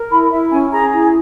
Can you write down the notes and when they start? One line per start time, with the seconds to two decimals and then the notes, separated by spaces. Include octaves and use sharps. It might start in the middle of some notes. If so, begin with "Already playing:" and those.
Already playing: A#4
0.11 E4 B5
0.31 E4 E5
0.51 C#4 G#5
0.71 G#4 A#5
0.91 E4